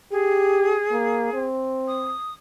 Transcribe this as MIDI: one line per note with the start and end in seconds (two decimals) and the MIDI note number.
0.12 0.77 67
0.12 1.44 68
0.91 1.33 58
1.33 2.14 60
1.88 2.34 87